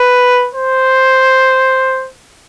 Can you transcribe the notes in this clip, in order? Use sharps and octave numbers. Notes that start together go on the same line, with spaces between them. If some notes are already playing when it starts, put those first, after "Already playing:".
Already playing: B4
C5